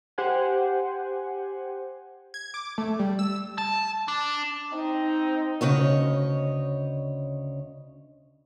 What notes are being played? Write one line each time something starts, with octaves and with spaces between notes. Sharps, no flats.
G4 C5 F#5 G#5
G#6
D6
A3
G3
E6
A5
D4
C4 D#4
D2 C#3 C#5 D#5